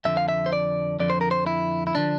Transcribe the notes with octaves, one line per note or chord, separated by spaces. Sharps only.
F2 D3 F3 E5
F5
E5
C5
D5
F2 D3 F3 D5
C5
A#4
C5
E4
E4
D3 F3 D4